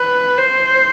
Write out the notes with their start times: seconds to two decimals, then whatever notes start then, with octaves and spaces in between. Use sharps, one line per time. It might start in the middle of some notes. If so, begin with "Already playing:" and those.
Already playing: B4
0.37 C5